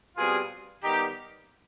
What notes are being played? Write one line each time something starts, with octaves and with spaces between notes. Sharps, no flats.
B2 G3 C4 F4 G#4
D#3 G3 B3 D#4 G4